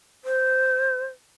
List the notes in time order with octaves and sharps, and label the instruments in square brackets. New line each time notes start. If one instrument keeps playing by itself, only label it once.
[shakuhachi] C5